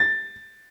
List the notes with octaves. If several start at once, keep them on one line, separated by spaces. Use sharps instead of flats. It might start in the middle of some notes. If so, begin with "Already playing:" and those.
Already playing: A6